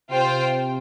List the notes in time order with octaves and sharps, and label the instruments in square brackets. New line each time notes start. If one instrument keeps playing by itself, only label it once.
[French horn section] C3 [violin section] F4 C5 G5